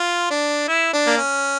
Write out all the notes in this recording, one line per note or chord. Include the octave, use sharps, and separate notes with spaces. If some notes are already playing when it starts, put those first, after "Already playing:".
Already playing: F4
D4
E4
D4
A#3
C#4